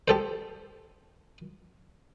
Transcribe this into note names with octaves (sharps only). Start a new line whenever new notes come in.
G4 A4 C5